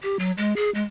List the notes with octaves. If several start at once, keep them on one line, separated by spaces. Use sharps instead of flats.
G4
F#3
G#3
G#4
G#3